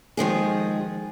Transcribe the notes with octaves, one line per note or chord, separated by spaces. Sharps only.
D#3 F3 G#3 G#4